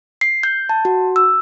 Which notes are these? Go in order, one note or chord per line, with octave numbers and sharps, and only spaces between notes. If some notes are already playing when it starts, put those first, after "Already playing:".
C7
G6
A5
F#4
E6